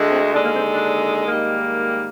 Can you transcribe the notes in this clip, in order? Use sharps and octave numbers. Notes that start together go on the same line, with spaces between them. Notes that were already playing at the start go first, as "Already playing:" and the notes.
Already playing: D2 D3 G#3
C4
D#2 D3 G#3 D4
A#3
C4
D4
G#2 D#3 G3 A#3 D#4